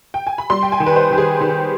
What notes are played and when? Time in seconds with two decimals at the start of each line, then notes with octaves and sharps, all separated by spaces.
0.14 G5
0.27 G#5
0.38 B5
0.50 G3 C6
0.63 G5
0.72 G#5
0.80 D#3
0.86 B4
0.96 C5
1.11 D#3 G4
1.18 G#4
1.41 D#3 G4